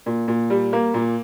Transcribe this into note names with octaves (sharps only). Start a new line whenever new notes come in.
A#2
A#2
G3
A#3
A#2